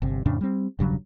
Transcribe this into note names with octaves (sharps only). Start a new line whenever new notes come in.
G1 C3
F2 A2 C#3 D4
G3 C4
E1 G2 C#3 F#3